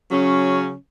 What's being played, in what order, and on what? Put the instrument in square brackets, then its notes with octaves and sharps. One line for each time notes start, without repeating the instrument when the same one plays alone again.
[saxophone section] C#3 F#3 C#4